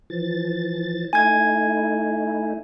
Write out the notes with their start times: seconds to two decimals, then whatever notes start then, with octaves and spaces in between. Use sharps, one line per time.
0.10 E3 F3 A6
1.13 A3 D#4 E4 G#5 G#6